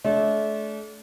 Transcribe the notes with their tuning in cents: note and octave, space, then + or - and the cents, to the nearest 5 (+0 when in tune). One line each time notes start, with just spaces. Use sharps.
A3 -35 D4 -35